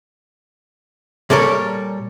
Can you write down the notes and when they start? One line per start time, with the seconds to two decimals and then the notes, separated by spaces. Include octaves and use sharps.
1.30 A#2 G3 A4 A#4 C#5